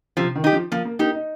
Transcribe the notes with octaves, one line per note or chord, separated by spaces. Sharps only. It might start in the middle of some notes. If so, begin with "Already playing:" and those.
C3 F3
D#3
D#4 G4
F3
F3 A#3
A#3
A#3 D#4 G4
D#4